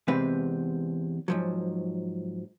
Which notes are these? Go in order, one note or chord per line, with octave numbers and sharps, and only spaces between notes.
E2 C3 G#3 C4 B4
G#2 F3 F#3